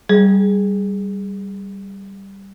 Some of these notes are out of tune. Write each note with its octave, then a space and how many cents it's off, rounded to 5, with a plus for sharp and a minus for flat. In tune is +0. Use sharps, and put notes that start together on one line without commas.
G3 +0 G#4 +0